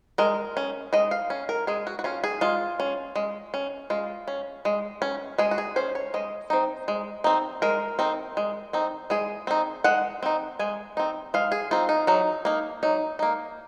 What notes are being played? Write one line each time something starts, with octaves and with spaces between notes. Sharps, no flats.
G#3 A#4
C#4
G#3 D#5
F5
C#4
A#4
G#3 G#4
F#4
F#4
C#4 F4
G#4
G#3 F4
C#4
G#3
C#4
G#3 F4
C#4
G#3
C#4
G#3 G#4
F#4
G#4
C#4 C5
C#5
G#3 D#5
C4 D#4
G#3
C4 D#4
G#3 A#4
C4 D#4
G#3
C4 D#4
G#3 G#4
C4 D#4
G#3 F#5
C4 D#4
G#3 G#5
C4 D#4
G#3 F5
G#4
C4 D#4 F4
D#4
F#3 D#4
A#3 D#4
F#3 D#4
A#3 D#4